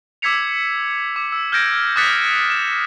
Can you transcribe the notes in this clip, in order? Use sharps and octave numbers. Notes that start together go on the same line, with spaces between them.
D6 E6 G#6 B6 C#7 F7
D6
E6
F6 G6 G#6 A#6 D7
D6 D#6 F#6 A6 B6 C#7
E7